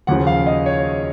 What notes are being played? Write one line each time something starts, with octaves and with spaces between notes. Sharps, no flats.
D#2 C#3 F3 F#5
F5
D#5
C#5